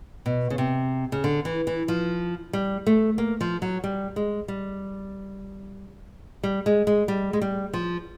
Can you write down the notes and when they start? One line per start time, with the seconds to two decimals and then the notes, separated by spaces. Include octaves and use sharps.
0.26 B2
0.50 C#3
0.58 C3
1.12 C#3
1.24 D3
1.45 E3
1.67 E3
1.88 F3
2.53 G3
2.87 A3
3.18 A#3
3.41 F3
3.62 F#3
3.84 G3
4.16 G#3
4.48 G3
6.43 G3
6.66 G#3
6.87 G#3
7.08 G3
7.33 G#3
7.41 G3
7.73 F3